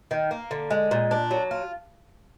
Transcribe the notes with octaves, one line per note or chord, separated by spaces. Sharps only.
D#3
A#3
D3
G#3
A#2
D4
F#3
F4